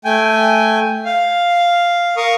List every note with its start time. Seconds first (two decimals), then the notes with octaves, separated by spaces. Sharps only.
0.05 A3 G5 G#5
1.05 F5
2.17 A#4 F5 C#6 D#6